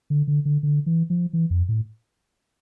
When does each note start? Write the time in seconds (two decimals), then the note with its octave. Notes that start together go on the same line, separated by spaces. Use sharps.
0.10 D3
0.28 D3
0.45 D3
0.63 D3
0.86 E3
1.10 F3
1.33 E3
1.50 F2
1.69 A2